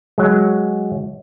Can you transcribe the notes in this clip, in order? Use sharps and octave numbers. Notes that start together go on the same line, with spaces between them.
F#3 G#3